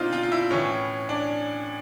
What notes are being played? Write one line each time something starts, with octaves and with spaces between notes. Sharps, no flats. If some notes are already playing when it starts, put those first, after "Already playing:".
Already playing: B2 C4 D4 D#4 F4
F4
F4
E4
A2 E3 C#4
D4